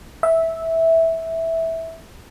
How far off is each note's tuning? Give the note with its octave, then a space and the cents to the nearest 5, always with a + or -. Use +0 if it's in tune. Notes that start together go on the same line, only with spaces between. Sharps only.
E5 -10